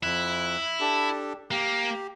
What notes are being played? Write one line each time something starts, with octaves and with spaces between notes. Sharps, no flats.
F2 E4 F#6
D4 G4 A4
A#3 G4